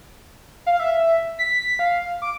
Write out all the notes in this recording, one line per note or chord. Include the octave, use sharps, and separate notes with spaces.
F5
E5
B6
F5
D6